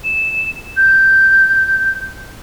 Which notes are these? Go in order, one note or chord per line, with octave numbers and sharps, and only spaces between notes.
E7
G6